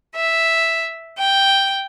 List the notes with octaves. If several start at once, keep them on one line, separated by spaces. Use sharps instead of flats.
E5
G5